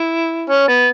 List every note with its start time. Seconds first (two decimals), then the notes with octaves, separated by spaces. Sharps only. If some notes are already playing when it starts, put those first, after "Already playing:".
Already playing: E4
0.50 C#4
0.68 B3